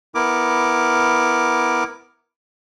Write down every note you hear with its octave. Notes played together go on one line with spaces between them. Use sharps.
B3 E4 A#4 D6